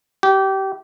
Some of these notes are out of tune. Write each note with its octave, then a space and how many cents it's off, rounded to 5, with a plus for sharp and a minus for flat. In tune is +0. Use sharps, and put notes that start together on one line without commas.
G4 -25